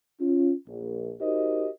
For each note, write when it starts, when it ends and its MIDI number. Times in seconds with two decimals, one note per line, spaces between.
0.20 0.52 61
0.20 0.52 65
0.67 1.12 34
1.21 1.68 63
1.21 1.68 66
1.21 1.68 67
1.21 1.68 70
1.21 1.68 72
1.21 1.68 75